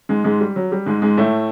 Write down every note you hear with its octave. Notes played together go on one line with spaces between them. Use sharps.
G#2 G#3
G#2 G#3
G3
F#3
G3
G#2 G#3
G#2 G#3
A2 A3